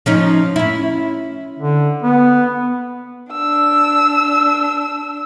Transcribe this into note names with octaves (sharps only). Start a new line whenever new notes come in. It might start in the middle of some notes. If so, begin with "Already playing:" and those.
F3 C#4 D#4
C#4 E4
D3
B3
D4 E6